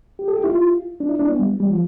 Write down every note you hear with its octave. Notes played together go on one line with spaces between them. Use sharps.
G4
A4
G4
E4
F4
D4
E4
D4
B3
G3
G3
F3